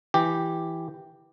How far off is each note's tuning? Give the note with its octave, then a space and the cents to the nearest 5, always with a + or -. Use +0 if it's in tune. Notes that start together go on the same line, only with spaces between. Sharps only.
E3 +0 G4 +0